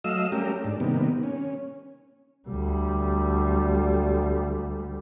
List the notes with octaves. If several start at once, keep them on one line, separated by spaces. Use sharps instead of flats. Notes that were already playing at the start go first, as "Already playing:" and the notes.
F#3 A3 D#5 F5 E6
G3 A3 C#4 G4 A#4
G#2 D4
C3 D#3 G3 A#3 B3
C#4
D2 G3